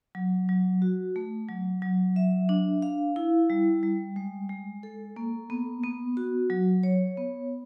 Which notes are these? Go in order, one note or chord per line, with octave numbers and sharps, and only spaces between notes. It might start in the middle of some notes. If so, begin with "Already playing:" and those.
F#3
F#3
F#4
A3
F#3
F#3
E5
D4
F5
E4
G3
G3
G#3
G#3
A4
A#3
B3
B3
F#4
F#3
C#5
B3